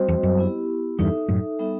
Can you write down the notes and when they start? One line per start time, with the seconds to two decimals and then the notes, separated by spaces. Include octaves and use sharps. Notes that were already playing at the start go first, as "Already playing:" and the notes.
Already playing: G3 C4 F#4 C5 D#5
0.08 E2
0.23 F#2
0.38 B3 E4 G4
0.99 E2 G2 D#4 A4 E5
1.28 F#2 A2
1.59 G3 B3 D#4 A4 E5